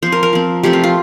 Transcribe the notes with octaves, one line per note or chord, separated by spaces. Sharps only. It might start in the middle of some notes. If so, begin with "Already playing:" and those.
F3 C4 C5
A#4
A#4
F3 C4
C3 F3 A3 C4 G4
F4
F4